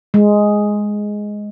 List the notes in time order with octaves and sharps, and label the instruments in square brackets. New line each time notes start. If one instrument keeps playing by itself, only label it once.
[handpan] G#3